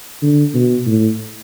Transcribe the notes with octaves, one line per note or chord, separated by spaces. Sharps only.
D3
B2
A2